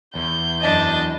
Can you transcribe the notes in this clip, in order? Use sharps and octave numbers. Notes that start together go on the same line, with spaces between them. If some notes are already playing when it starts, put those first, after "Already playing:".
E2 G6
F#2 D4 D#5 A5